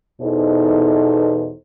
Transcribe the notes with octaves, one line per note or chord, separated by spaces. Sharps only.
E2 B2 E3 D#4 A4 C5